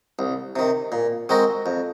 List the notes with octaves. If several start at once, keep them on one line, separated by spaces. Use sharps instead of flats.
C2
C3 D#3
A#2
G#3 C4 F#4 A#4
F2